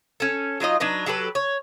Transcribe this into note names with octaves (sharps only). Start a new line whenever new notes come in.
C#4 A4
F#3 D#4 F4 D#5
F#3 D4 D#4 B4
F#3 G4 A4 B4
C#5